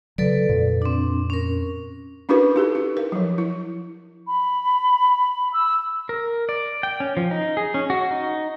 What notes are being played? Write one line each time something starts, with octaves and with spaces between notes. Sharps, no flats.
C#3 F#3 A4 B4 D5
F2 A#2
C4 D4
C#4 A#4
C#4 D4 E4 F#4 A#4 B4
D#4 G4 A4
E4
A#4
F3 F#3
E4
B5
E6
A#4
D5
G5
C#4
F3
D#4
G#4
C#4
F#4
D#4